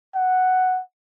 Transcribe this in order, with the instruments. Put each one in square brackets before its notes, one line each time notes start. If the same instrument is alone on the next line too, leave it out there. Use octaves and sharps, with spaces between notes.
[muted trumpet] F#5